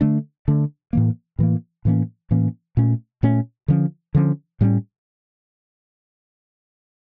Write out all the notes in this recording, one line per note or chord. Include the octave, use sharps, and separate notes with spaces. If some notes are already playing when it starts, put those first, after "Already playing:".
D3 A3 D4
D3 A3 D4
A2 E3 A#3
A2 E3 A#3
A2 E3 A#3 C#4
A2 E3 A#3 C#4
A#2 A3 C#4
A#2 A3 C#4
D3 F3 C#4
D3 F3 C#4
A2 G3 A#3 C#4